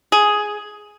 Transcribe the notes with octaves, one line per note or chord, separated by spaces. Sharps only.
G#4